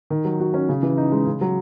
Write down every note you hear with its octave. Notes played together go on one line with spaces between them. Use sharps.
D#3
F#3
F#4
C#4
C#3
E3
D#4
G#3
C#3
F#3